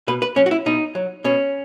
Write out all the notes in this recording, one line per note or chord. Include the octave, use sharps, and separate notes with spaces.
B2 B4
B4
F#3 C#4
F#4
E4
B2 D#4
F#3
B2 C#4